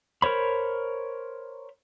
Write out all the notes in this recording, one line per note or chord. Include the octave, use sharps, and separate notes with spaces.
A#4 C5 C#5 B5